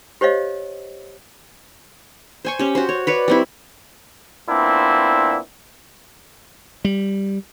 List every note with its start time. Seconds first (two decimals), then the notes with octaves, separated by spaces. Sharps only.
0.21 G4 C5 C#5 D#5 F5
2.45 C5 G#5 C#6
2.59 C#4 G4
2.75 F#4 C5
2.89 C#5
3.07 B4 C#5 D5
3.28 G3 C4 E4
4.48 A#2 B3 C4 D4 E4
6.85 G3